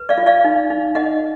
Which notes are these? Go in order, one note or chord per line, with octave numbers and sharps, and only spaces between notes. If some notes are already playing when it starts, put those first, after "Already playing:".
Already playing: B4
D5 F5
F4
D5 F5
D#4
D#4
D#4 D#5 F#5